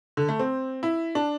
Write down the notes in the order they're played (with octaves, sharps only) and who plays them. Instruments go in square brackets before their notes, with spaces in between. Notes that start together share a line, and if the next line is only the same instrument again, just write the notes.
[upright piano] D3
A3
C4
E4
D4